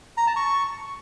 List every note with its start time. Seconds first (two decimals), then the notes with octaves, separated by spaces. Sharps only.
0.17 A#5
0.27 A5
0.36 C#6